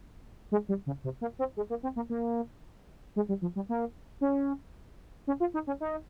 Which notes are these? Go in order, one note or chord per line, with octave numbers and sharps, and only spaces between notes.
G#3
G3
C#3
C3
A#3
C4
G#3
A#3
C4
A#3
A#3
G#3
G3
F3
G3
A#3
C#4
C#4
F4
D#4
C#4
D#4